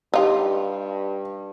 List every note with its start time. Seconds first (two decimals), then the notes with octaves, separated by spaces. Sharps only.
0.14 G2 D#4 F4 G4